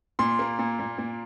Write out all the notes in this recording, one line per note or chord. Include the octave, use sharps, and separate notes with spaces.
A#2 C6
A#3
A#2
A#2
A#2